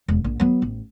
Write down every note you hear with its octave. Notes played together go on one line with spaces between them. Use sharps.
E1
A#1
F#3 B3
A1